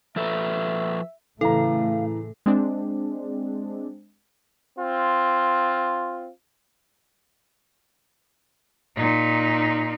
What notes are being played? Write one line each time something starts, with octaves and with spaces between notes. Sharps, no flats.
F3 A4 B4 E5
A2 C#3 E3 A3 A4 F5 A#5
G#3 C4 D4
C4 F4
A#2 D#4